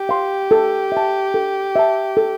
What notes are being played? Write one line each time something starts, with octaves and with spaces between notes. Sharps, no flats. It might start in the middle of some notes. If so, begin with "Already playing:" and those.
Already playing: G4
F5 C6
A4
E5 A5
A4
E5 A5
A4